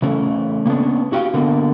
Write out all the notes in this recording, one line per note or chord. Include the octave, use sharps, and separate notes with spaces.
C#3 E3 A3 C#4
A#3 B3 C#4 D4
E4 F#4 G4 D#5 F5 G5
D3 A#3 B3